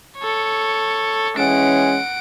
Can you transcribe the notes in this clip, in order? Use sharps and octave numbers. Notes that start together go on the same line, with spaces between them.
A4 C#5
E3 G#3 C#4 F#5 D7